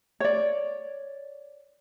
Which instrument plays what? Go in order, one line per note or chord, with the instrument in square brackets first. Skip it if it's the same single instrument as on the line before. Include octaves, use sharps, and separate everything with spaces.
[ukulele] C#5 D5